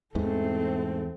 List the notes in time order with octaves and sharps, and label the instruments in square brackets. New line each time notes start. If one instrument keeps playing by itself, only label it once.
[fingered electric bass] E2 G#2 E3 [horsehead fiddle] A3 C4